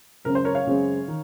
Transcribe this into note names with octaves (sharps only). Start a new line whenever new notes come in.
F#2 C#3 G#3 C4 A#4
C5
A#4 C#5
C#5 F5
F#2 C#3 G#3 C4
D#3